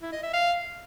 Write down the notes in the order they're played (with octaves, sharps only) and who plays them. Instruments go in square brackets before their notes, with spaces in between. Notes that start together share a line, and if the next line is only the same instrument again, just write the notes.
[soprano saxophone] E4
D#5
E5
F5